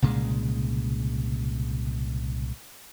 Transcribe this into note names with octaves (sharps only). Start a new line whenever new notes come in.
C2 A#2 C#3 G#3